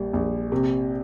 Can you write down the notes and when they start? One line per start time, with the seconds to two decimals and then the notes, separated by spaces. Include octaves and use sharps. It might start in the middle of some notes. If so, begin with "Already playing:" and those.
Already playing: A#1 G3
0.13 A#1
0.52 C3